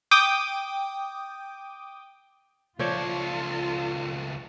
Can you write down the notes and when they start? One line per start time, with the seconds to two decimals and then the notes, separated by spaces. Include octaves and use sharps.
0.11 G5 D6 D#6
2.79 C#2 F3 F4 A4 C#5 D5